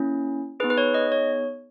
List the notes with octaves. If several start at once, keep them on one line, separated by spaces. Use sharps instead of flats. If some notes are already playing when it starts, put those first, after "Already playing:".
Already playing: A#3 C#4 E4
B3 D#4 G#4 B4
B4
C#5
D#5
C#5